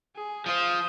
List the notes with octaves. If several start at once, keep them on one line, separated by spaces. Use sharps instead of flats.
G#4
F3 F4 C5 D#6